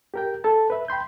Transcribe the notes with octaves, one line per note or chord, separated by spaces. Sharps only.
G4 A#4 G5
A4 A5
B4 E5
G5 B5 C6 G6